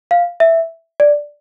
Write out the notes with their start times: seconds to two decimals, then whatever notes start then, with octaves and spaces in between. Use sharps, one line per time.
0.11 F5
0.40 E5
1.00 D5